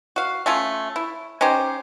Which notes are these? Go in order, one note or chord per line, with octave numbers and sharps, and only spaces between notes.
F#4 F5
A3 C#4 F4
E4
C#4 D#4 G4 C5